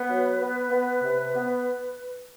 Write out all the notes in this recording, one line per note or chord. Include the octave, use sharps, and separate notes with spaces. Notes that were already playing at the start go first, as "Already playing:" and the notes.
Already playing: B3 B4
F#3
B3
B3
C3
B3